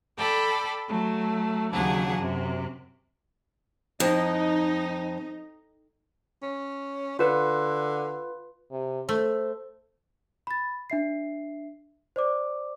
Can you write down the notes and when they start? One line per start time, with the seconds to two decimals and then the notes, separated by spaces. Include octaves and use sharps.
0.18 A4 D5 G5 B5
0.88 F#3 A3
1.72 D#2 C#3 F#3 D4 G#4 F#5
2.20 F#2 C3
4.00 F2 D#4
6.42 C#4
7.19 D3 F4 B4
8.71 C3
9.09 A3 C5
10.47 B5 A6
10.90 D4 E5 C7
12.16 C5 D5 D6